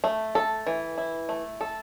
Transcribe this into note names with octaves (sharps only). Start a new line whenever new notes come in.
A3
A4
E3
E4
A3
A4